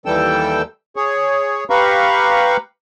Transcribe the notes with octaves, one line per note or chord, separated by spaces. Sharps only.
D#2 E3 G3 A4 G5 E6
G#4 C#5
G4 B4 F5 A#5 B5 C#6